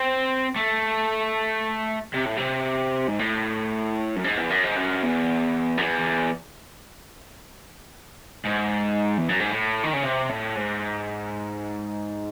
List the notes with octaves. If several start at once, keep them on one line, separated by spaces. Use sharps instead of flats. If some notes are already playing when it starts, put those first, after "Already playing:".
Already playing: C4
A3
C3
A2
C3
G#2
A2
F#2
G#2
E2
F#2
G#2
F#2
E2
F#2
E2
G#2
E2
F#2
G#2
A2
D#3
C#3
C3
A2
G#2